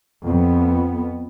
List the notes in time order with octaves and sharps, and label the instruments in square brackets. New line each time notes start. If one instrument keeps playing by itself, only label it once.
[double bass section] F2 B3